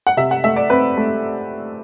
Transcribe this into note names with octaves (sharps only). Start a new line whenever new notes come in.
F#5
C3 E5
F#5
A3 E5
D5
C4 B4
A3